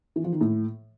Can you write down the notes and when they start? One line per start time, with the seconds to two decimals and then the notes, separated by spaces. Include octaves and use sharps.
0.16 E3
0.24 F3
0.32 D#3
0.41 A2